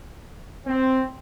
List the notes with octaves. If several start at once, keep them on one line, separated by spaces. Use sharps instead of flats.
C4